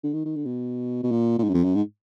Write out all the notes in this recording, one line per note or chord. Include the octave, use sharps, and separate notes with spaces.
D3
D#3
D#3
D3
B2
B2
A#2
A#2
G#2
F#2
F2
F#2
G#2